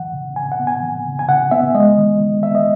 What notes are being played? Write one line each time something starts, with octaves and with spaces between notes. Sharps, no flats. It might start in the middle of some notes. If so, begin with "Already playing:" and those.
Already playing: E3 F#5
C#3
C#3 G#5
F#5
B3
G#5
E3
C#3
G#5
C#3 F#5
B3 E5
G#3 D#5
D#3
D#3
B3 E5
D#5